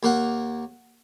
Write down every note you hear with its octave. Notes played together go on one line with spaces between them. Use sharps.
D#2 A#3 A#4 F#5